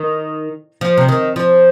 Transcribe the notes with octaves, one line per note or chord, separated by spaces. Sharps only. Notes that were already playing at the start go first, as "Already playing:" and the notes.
Already playing: D#3
F3
C3
D#3
F3